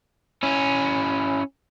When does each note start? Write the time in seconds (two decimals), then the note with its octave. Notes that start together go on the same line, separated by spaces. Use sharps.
0.43 C#4 E4